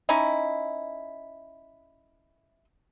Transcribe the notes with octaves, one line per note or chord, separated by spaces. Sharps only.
C#4 D#4 E4